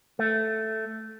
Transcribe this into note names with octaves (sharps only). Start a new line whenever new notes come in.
A3